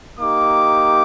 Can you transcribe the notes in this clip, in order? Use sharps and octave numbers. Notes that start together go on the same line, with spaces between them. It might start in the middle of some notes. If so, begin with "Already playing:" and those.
A#3 D#4 G4 D6